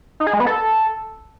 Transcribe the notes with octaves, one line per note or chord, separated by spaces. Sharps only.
D#4
G#4
G#3
B3
A4